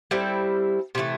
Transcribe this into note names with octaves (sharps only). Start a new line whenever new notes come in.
G3 C4 E4 A4
C3 E3 A3